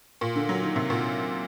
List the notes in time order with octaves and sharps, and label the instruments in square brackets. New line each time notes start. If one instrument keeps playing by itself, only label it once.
[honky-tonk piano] A#2
D3
F#3
D#3
C3
A#2